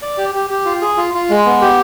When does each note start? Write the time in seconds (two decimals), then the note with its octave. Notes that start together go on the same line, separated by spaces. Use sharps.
0.02 D5
0.18 G4
0.35 G4
0.50 G4
0.65 F4
0.82 G#4
0.97 F4
1.14 F4
1.30 G#3
1.46 B3
1.61 G4